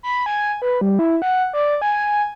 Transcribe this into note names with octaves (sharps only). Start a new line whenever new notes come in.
B5
G#5
B4
G3
E4
F#5
D5
G#5